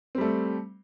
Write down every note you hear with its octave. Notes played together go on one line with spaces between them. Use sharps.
G3 A3 C4